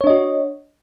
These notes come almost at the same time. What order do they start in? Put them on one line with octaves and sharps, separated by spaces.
C#5 D4 D#5 F#4